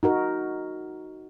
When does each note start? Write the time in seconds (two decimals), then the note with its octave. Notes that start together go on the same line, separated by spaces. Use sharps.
0.03 D#4 F#4 A#4